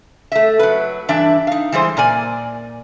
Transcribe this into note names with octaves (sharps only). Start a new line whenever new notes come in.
A3 E5
F#3 B4
G2 E3 D4 E5
D#4 F5
E3 G3 G#3 C5
A#2 A#4 D5 G#5